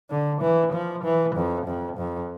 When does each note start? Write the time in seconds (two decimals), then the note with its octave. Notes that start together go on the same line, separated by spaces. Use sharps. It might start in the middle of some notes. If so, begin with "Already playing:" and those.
0.10 D3
0.42 E3
0.73 F3
1.04 E3
1.36 F2
1.67 F2
1.98 F2